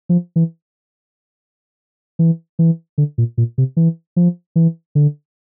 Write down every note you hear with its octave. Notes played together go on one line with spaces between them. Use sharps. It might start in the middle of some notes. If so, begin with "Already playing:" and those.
F3
E3
E3
E3
D3
A#2
A#2
C3
E3
F3
E3
D3